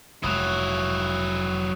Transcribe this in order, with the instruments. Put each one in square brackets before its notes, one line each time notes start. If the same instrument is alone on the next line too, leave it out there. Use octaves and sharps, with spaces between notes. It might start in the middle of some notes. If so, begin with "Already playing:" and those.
[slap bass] F1 G#3 [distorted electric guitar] F#3 E4 [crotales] D#6 F#6